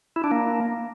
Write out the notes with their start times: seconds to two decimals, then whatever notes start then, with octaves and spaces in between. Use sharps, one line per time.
0.16 E4
0.24 D4
0.31 A#3